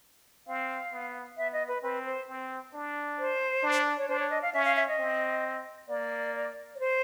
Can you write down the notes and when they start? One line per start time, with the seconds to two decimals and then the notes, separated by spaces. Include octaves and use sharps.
0.47 C4 F5
0.92 B3
1.37 B3 E5
1.53 D#5
1.68 B4
1.83 C4 B4
2.05 C5
2.28 C4
2.73 D4
3.18 C5
3.63 D4
3.98 C#5
4.08 D4 C5
4.19 C#5
4.30 D#5
4.42 F5
4.54 C#4 E5
4.65 F5
4.76 E5
4.88 D#5
4.98 C4
5.89 A#3 D5
6.75 C#5
6.79 C5